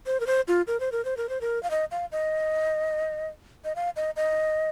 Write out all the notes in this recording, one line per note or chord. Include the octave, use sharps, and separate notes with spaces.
C5
A#4
C5
F4
A#4
C5
A#4
C5
A#4
C5
A#4
F5
D#5
F5
D#5
D#5
F5
D#5
D#5